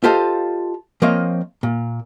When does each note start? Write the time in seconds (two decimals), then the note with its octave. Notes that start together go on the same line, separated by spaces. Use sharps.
0.04 F4 G4 A4 C5 D#5 F5
1.02 F3 A#3 C4 C#5 D#5 F5
1.63 A#2